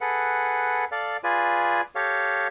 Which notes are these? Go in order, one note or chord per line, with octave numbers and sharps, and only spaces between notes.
G#4 A4 B4 F#5
A4 D5 F5
F4 G#4 B4 D5 G#5
G4 A4 C#5 F5